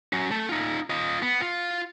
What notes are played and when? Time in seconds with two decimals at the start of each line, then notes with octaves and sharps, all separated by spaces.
0.13 F#3 C#4
0.31 A3 A5
0.49 D#4 F4
0.90 F4 D#5
1.22 B3
1.41 F4